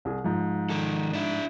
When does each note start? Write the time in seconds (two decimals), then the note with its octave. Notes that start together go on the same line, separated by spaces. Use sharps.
0.05 C2 G#4
0.24 G#2 F3
0.70 D#3 A4
1.13 D4 E4